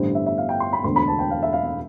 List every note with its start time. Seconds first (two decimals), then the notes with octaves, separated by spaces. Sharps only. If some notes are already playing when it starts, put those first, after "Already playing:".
Already playing: A1 G2 D3 G3 C5
0.15 E5
0.26 E5
0.38 F5
0.49 G5
0.60 C6
0.73 B5
0.83 E1 D2 D3 C6
0.96 B5
1.08 A5
1.19 G5
1.31 F5
1.43 E5
1.53 F5
1.65 E5